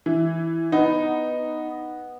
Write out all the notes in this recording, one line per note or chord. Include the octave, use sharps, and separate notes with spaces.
E3
B3 D#4